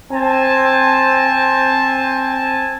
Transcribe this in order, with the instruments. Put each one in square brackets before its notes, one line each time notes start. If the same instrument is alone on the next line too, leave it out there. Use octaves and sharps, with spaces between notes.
[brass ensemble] C4 G#5 A5